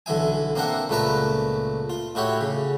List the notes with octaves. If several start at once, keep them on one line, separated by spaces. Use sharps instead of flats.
B1 D3 E3 E5 G#5
A#3 C4 D4 A#4 E5 F#5
C#2 A#2 A3 B4 A5 A#5
F4
A2 E4 F#4 G4 C#5
C#3